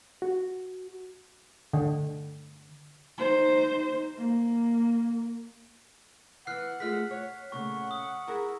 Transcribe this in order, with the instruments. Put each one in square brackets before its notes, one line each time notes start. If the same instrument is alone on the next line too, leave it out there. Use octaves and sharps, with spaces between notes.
[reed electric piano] F#4
[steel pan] D3
[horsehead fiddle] D#4 C5
A#3
[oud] E3 B3 [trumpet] F#5 [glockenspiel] F6 F#6 C7
[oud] G#3 A3 F4 [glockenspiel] F6 B6
[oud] C#5
[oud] A#2 C#3 A3 [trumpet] F#5 [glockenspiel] C#6
[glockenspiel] D#6
[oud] E4 G#4 A#4